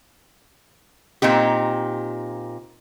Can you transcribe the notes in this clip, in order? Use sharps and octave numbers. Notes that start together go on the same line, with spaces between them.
A#2 C4 D#4 G4